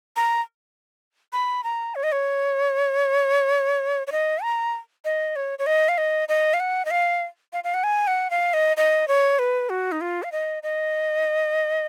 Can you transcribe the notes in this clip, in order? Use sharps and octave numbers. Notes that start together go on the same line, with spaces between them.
A#5
B5
A#5
C#5
D#5
C#5
C#5
D#5
A#5
D#5
C#5
C#5
D#5
F5
D#5
D#5
F5
F#5
D#5
F5
F5
F5
F#5
G#5
F#5
F5
D#5
D#5
C#5
B4
F#4
D#4
F4
F5
D#5
D#5